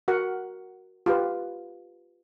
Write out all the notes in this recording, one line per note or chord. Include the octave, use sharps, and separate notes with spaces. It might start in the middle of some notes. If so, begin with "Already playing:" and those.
F#4 A#4 F#5
F4 G4 B4